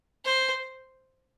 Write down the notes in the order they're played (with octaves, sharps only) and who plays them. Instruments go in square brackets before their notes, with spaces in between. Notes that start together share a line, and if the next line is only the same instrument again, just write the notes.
[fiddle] C5